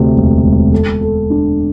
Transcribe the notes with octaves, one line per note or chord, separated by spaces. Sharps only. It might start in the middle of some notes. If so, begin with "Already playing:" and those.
Already playing: D2 C3
E1
E1
A4
A4
D4